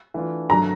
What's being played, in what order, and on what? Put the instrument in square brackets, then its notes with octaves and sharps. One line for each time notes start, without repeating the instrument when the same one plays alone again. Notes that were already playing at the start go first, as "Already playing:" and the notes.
[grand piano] E3 A3 D4 F4
[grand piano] G2 D#3 F#3 A3 [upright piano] A#5